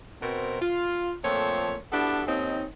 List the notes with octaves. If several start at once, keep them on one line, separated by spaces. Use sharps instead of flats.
B2 C4 A#4
F4
F2 A#2 A3 C5 C#5
B3 D4 E4 F#4 G4 A4
D#2 C4 C#4 D#4